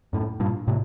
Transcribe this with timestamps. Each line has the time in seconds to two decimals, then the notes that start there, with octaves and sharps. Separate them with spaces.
0.13 F#2 A2
0.40 G2 A#2
0.67 A2 C3